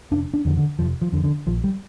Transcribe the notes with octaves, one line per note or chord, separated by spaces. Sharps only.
F1 D4
D4
F2 D3
D3
F1 F3
F3
F2 D3
D3
A#1 F3
G3